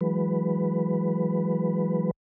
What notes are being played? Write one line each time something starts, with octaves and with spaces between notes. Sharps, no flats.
E3 F#3 G#3 B4